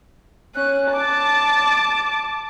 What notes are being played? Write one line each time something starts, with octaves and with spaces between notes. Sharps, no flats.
C#4 F#6
A5 D6